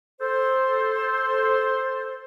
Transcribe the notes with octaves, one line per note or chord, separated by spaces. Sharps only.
A4 C5